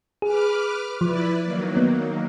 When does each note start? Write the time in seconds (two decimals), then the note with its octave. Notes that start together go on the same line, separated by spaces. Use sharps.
0.22 G#4 B4 D6 F6
1.01 F3 E4 B4 D5
1.42 D#3 F#3 A#3
1.77 B3